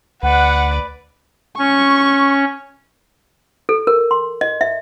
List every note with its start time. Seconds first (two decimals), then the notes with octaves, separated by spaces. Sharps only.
0.23 D2 B4 D5 F#5
1.58 C#4 C#6
3.69 A4
3.87 A#4
4.11 C6
4.41 D#5
4.61 E5